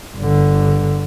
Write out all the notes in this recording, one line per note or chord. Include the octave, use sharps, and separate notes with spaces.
G1 D3